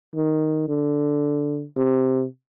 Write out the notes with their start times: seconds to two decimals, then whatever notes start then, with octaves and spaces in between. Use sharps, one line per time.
0.15 D#3
0.68 D3
1.76 C3